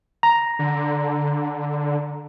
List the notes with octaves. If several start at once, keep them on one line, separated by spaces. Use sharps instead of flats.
A#5
D3